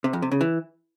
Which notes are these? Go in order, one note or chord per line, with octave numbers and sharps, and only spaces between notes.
C3
F2
C3
C#3
E3